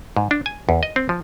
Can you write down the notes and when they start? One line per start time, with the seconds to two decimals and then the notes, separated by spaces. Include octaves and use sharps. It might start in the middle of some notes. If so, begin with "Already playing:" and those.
0.17 G#2
0.31 D4
0.46 G#5
0.69 E2
0.83 D#5
0.96 C4
1.09 F3